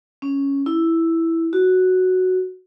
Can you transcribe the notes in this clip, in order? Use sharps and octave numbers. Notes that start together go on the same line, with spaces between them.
C#4
E4
F#4